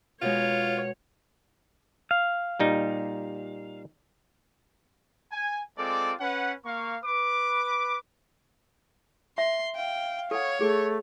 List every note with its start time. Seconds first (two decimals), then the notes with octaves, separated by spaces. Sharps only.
0.22 B2 G#3 F4 C#5
2.11 F5
2.59 A#2 G3 D#4
5.32 G#5
5.78 G#3 C4 F4 A4 D5 D6
6.20 C#4 B4 F#5
6.65 A#3 F5 C#6
7.04 B4 D6
9.38 E5 C6
9.75 F5 G5
10.31 A4 C#5 F#5
10.61 A3 G#4